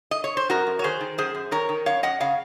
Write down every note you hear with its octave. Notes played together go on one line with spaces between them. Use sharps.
D#5
C#5
C5
F#2 F#4 A#4
F#2
C#5
D#3 G#4 C5
D#3
F#2 G#4 C5
F#2
D#3 A#4 C#5
D#3
F#2 C#5 F5
F#2 D#5 F#5
C#3 C#5 F5